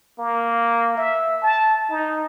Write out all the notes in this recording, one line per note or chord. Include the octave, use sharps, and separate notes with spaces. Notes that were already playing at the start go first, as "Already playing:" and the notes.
A#3
E5
A5
D#4